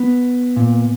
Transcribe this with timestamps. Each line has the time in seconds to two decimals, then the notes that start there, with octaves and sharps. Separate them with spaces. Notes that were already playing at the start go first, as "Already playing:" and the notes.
Already playing: B3
0.56 A#2